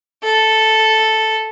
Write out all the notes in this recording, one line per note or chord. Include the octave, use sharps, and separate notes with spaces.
A4